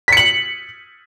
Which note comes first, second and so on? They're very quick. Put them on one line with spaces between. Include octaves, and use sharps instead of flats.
B6 C#7 F#7